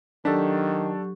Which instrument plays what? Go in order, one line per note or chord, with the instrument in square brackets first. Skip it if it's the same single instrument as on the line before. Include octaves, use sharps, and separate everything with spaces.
[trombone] D#3 [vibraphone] F#3 G4 C#6 [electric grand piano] D4 A4